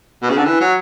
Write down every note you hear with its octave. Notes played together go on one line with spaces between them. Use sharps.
B2
C#3
D3
E3
F#3